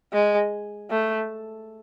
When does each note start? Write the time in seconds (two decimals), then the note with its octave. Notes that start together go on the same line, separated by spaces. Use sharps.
0.13 G#3
0.91 A3